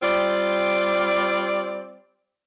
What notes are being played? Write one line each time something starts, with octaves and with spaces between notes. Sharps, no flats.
G3 C4 F4 D5